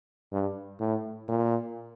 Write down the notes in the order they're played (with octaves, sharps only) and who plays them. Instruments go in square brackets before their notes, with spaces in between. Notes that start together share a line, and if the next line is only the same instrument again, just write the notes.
[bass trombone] G2
A2
A#2